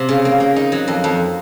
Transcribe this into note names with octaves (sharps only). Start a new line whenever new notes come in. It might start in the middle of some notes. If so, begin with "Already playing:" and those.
Already playing: C3
C#3
A#3
A#3
D#4
F#3
F2
F2